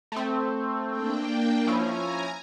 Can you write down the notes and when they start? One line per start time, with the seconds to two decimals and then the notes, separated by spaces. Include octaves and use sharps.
0.12 A3 C4
0.88 A#3 D4 G5
1.67 F3 C#4 E4 G#5 A#5